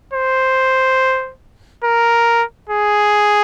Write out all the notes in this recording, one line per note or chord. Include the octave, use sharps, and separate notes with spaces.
C5
A#4
G#4